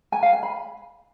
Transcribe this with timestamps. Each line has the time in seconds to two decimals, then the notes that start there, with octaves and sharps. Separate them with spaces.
0.12 G#5
0.23 F5
0.33 G#5
0.43 B5